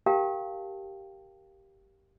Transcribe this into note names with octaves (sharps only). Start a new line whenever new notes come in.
G4 A#4 F5 G5 A5